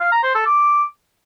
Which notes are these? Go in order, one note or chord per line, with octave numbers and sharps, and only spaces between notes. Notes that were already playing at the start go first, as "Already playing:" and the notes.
F5
A#5
C5
A4
D6